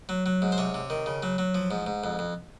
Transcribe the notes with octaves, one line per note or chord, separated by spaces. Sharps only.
F#3
F#3
G#2
C5
C3 C#5
C3
D#3
C#3
F#3
F#3
F3
G#2
G#2
F2
F2